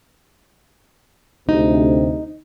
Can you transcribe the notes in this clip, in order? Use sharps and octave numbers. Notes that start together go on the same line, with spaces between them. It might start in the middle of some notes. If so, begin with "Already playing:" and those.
D2 C3 D#4